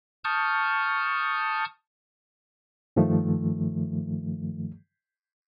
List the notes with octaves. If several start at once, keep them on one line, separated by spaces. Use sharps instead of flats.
A5 C#6 D#6 F6 G6
G2 D#3 F3 A3